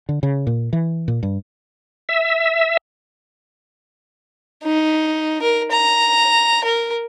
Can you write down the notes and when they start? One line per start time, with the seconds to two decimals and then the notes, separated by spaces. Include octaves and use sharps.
0.09 D3
0.23 C#3
0.47 A#2
0.73 E3
1.08 A#2
1.23 G2
2.09 E5
4.63 D#4
5.42 A#4
5.72 A#5
6.64 A#4